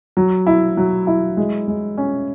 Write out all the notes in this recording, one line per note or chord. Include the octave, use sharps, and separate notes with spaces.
F#3
E4
F#3
E4
G#3
G#3
C#4